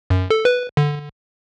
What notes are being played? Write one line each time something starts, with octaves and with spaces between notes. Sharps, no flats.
F#2
A4
B4
D3